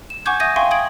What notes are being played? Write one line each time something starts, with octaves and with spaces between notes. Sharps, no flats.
E7
F#5 G#5 C#6 D6 G6 G#6
E5 D#6 G6 G#6 A#6 D#7
E5 F5 G5 G#5 C6 C#6
D#6 G#6 D7 F#7